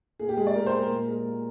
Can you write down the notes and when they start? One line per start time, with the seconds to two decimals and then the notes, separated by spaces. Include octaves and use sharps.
0.19 A#2 G#4
0.29 G4
0.37 G#3 G#4
0.47 D5
0.55 A#2 A#4
0.66 C5
0.73 G#3
0.79 A#4
0.90 A#2
1.08 G#3
1.25 A#2